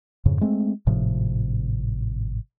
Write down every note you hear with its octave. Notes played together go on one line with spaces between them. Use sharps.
F2 G#2 C#3
G#3 A3 C4
G#1 A2 C3 F3